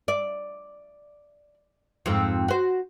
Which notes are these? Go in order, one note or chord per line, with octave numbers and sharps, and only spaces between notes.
D5
F2 G#2 C4
F#4 C5